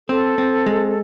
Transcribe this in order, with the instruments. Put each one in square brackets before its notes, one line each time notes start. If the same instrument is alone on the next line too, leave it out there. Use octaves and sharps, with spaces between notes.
[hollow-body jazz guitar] C4 [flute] A4
[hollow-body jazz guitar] C4
G#3